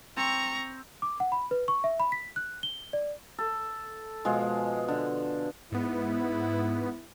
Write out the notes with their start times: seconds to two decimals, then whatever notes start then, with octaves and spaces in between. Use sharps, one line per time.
0.17 C4 A#5 C#6
1.02 D6
1.20 F#5
1.32 B5
1.51 B4
1.68 C#6
1.84 E5
2.00 B5
2.12 B6
2.36 F#6
2.63 G7
2.93 D5
3.38 A4
4.25 B2 F3 G#3
4.88 D3
5.72 G#2 B3 E4